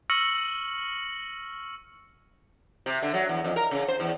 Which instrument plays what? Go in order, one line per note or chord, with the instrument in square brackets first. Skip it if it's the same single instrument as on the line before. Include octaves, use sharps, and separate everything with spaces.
[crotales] C#6 E6 F6 A#6 C#7 F#7
[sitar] C3
D3
F#3
E2
F2
A#4
C#3
C5
E2